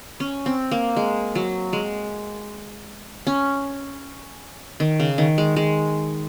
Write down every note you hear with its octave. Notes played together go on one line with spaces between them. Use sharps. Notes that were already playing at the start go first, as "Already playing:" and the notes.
C#4
C4
A#3
G#3
F#3
G#3
C#4
D#3
C#3
D#3
G#3
G#3